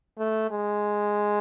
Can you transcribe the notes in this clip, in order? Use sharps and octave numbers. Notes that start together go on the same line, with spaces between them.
A3
G#3